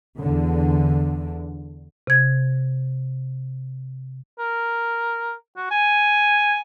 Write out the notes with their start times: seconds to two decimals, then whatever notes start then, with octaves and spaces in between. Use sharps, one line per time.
0.18 E2 D3
2.07 C3 G#6
4.39 A#4
5.56 F#4
5.71 G#5